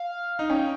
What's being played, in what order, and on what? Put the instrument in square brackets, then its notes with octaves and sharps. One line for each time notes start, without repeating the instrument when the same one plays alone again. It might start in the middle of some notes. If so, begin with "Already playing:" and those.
Already playing: [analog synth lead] F5
[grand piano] D#4
[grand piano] C#4 [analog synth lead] G5